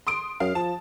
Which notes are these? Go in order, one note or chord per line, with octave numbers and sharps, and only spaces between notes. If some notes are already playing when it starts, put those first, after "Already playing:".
C6 D#6 D7
F#2 F5
F3 A5